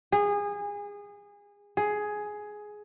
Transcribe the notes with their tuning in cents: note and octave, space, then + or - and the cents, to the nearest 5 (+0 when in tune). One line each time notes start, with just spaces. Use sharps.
G#4 -25
G#4 +10